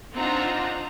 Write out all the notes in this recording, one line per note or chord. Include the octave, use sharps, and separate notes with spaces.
C4 D4 D#4 F4 F#5 A#5